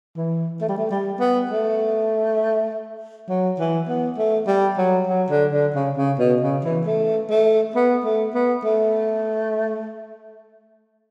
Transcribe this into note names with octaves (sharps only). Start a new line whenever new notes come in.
E3
A3
G3
A3
G3
B3
A3
F#3
E3
B3
A3
G3
F#3
F#3
D3
D3
C#3
C#3
B2
C#3
E3
A3
A3
B3
A3
B3
A3